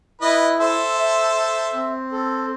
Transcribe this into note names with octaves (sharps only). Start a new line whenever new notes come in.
E4 B4 D#5
A4 C5 E5
E5
E5
C4
A4